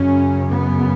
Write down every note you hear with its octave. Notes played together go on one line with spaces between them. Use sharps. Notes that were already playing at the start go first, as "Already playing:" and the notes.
Already playing: F#2 C#3 C#4
B3